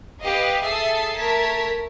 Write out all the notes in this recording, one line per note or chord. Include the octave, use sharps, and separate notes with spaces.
G4 B4 D#5 F5
G#4 A4 E5 D#6 A6 C7
A3 A#4 A5 G#6 B6